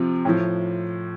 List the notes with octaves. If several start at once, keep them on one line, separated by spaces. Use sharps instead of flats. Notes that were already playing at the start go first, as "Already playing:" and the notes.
Already playing: C3 F3
A2 F3